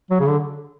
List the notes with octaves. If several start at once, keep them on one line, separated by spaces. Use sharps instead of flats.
F#3
C#3
D3